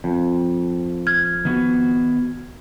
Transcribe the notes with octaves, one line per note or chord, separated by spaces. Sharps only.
F2
F6 G#6
D#3 B3 F#4